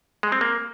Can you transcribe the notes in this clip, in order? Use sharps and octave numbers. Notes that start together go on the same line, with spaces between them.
G#3
C4
A#3